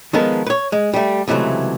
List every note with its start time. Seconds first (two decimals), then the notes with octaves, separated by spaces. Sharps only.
0.13 D#3 F3 G#3 B3 A4 A#4
0.47 B4 C#5
0.72 G#3
0.94 G3 A3
1.28 C#2 C3 E3 F#3 A3